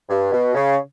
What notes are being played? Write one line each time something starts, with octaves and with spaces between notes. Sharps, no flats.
G2
B2
C#3